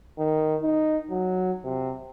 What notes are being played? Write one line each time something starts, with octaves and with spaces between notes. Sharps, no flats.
D#3
D#4
F#3
C3